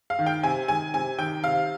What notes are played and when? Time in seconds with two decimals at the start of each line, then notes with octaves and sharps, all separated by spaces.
0.10 F5
0.19 D#3
0.26 G5
0.43 C3 G#5
0.68 D#3 G#5
0.94 C3 G#5
1.18 D#3 G5
1.43 C3 F5